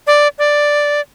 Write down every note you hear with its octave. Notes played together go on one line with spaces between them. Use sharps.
D5
D5